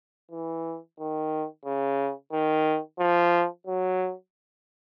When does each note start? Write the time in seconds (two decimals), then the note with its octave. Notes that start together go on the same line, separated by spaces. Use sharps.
0.31 E3
0.99 D#3
1.65 C#3
2.32 D#3
2.99 F3
3.67 F#3